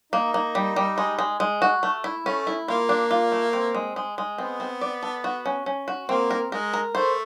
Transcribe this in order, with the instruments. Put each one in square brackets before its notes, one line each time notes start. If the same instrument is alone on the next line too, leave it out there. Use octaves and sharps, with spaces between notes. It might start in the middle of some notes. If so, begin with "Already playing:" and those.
[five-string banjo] A#3 [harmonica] D#4
[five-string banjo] A#3
G3
G3
G#3
G#3
G#3
F#4
A3
E4
[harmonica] A3 [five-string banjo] C#4
[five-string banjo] E4
[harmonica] A#3 [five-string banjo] F4
[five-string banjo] D4
F4
A3
C4
G#3
G#3
G#3
[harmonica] B3 [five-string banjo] C4
[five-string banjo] C4
D5
A4
F#4
C#4
C#4
F#4
[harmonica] A#3 [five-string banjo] C4
[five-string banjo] A#4
[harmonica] G#3 [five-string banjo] A#4
[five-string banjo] A#4
[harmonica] A3 [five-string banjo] C5